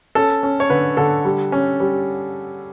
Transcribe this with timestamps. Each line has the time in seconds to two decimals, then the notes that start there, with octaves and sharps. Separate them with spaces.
0.15 C#4 A4
0.43 C#4
0.60 C#5
0.70 D3 B4
0.97 D3 A4
1.25 G3
1.52 C#4
1.80 G3